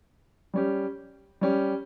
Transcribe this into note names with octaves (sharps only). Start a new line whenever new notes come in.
G3 C#4 G4
G3 C#4 G4